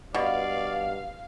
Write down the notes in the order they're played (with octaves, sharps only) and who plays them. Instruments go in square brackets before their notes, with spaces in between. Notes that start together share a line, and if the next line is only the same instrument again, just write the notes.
[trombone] G2 [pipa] B2 [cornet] D5 [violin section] F5